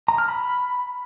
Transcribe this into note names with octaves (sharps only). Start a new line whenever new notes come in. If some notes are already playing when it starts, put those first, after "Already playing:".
A#5
F6
B5